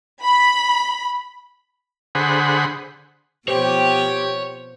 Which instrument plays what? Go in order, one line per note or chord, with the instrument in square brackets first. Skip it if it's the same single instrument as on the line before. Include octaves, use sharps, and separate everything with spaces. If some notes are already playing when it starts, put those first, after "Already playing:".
[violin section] B5
[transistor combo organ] D3 G#4 C5 F#5 B5
[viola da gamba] B2 F3 B3 [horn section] G4 [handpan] C5 [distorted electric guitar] C#5